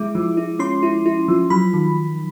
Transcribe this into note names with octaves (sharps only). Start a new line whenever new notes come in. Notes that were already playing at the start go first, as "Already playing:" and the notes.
Already playing: G#3 E4 D6
F3
E4
C#4 C6
E4
E4
F3
F#3 B5
D#3